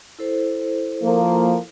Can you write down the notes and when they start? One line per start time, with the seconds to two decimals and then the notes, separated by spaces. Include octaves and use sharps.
0.19 E4 A4 C5
1.04 F3 A#3